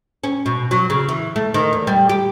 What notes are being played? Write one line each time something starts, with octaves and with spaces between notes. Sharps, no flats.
C#4
B2
F#3
C#3
E3
A3
D#3
E2
G3
G4